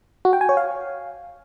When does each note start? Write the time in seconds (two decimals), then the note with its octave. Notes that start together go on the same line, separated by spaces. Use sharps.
0.25 F#4
0.33 G5
0.41 G#5
0.49 C#5
0.57 F5